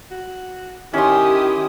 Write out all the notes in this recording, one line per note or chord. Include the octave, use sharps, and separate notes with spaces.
F#4
D#3 C#4 E4 G4 C6 D#6